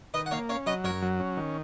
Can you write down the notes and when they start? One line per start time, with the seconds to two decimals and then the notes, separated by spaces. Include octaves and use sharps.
0.14 D#3 B4 D#5
0.26 F#5
0.31 A#3 C#5 F5
0.49 C#4 C#5 F5
0.66 F#3 B4 D#5
0.84 F#2 A#4 C#5
1.02 F#3
1.20 C#4
1.37 D#3